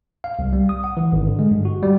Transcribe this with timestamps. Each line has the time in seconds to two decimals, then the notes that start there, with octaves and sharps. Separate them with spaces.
0.24 F5
0.39 C2
0.53 G3
0.69 D#6
0.84 F#5
0.97 E3
1.12 G#1
1.27 D3
1.39 G#3
1.51 G2
1.65 F#4
1.83 G3